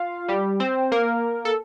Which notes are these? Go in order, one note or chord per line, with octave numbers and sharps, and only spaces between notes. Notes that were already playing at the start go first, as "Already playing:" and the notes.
Already playing: F4 F5
G3 G4
C4 C5
A#3 A#4
A4